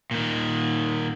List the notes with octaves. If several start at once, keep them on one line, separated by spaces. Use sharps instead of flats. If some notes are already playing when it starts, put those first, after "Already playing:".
A#2 D#3